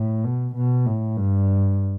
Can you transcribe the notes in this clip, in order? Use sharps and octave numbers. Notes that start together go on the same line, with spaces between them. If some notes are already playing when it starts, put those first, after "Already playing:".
Already playing: A2
B2
B2
A2
G2